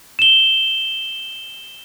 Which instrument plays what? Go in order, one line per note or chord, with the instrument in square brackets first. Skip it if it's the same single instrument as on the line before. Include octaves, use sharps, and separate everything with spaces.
[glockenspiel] E7 G7